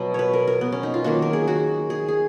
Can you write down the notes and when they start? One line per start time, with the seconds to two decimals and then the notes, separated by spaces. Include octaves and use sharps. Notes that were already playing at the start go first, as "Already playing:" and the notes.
Already playing: B2 F#3 B3
0.14 B4 C#5
0.33 A#4
0.47 A#4
0.61 B3
0.72 C#4
0.83 D#4
0.94 F4
1.04 D#3 F#3 A#3 F#4
1.22 A#4
1.33 G#4
1.48 F#4
1.90 G#4
2.08 G#4